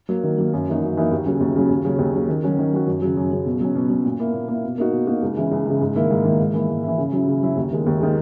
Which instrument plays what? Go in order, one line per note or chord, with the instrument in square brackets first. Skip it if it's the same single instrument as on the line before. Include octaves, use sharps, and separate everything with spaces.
[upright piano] F#3 A#3
D#3
F#3 A#3
F#2
E3 A#3 D#4 F#4
F#2
E3 A#3 D#4 F#4
D#2
C#3 F#3
D#2
C#3 F#3
D#2
C#3 F#3 C#4
D#2
C#3 F#3 C#4
D#3
F#3 C#4 F#4
D#3
F#3 C#4 F#4
F#2
C#3 F#3
F#2
C#3 F#3
B2
F#3 C#4
B2
F#3 C#4
A#2
A#3 E4
A#2
A#3 E4
B2
A#3 D#4 F#4
B2
A#3 D#4 F#4
C#2
C#3 E3
C#2
C#3 E3
G#2
D#3 A#3 E4
G#2
D#3 A#3 E4
G#2
E3 A#3 E4
G#2
E3 A#3 E4
C#3
F#3 C#4 E4
C#3
F#3 C#4 E4
D#2
D#3 G#3
D#2
D#3 G#3